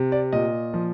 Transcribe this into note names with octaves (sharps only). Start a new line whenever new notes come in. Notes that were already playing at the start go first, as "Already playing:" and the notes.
Already playing: C3
D5
A#2 D#5
F3